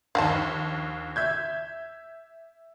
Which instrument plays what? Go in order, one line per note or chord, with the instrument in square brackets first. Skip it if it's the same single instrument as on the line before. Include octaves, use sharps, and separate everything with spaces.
[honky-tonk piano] A#1 D#2 [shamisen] F5 F#5 A5
[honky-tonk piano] E5 G6 G#6